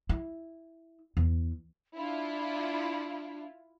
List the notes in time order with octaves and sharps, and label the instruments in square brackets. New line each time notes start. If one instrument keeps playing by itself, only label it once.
[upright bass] E4
E2
[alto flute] D4 [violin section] E4 F4